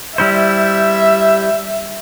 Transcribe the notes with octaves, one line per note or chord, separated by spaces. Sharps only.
G3 E4 C5 E5